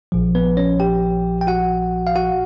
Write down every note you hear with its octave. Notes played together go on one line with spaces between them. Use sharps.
A#1 A#2 F3
B3 B4
C#4 C#5
G4 G5
G5
F#4 F#5
F5
F#4 F#5